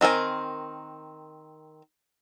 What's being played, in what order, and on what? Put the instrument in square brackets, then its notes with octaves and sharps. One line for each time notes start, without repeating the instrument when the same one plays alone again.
[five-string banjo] D#3 C4 A#4 G#5